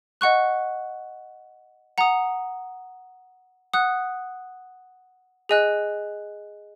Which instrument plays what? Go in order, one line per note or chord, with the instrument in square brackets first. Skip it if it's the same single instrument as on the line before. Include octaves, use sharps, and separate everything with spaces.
[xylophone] D#5 F#5 C#6 F#6
F#5 A#5 D#6
F#5 D#6 F#6
G#4 D#5 G#5 F#6